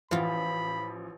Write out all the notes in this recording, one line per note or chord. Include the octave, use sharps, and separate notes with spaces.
A1 E3 F3 F4 B5